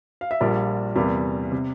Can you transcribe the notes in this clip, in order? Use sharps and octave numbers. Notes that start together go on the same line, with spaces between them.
F5
E5
A#1 A#2 G3 A#3 D5
E2 C3 G3 A#3
C3